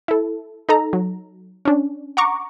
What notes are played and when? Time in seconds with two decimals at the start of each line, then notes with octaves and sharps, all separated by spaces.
0.08 E4 A4
0.69 D#4 A4 A#5
0.93 F#3
1.65 C#4 D4
2.17 F#5 A#5 C#6 D6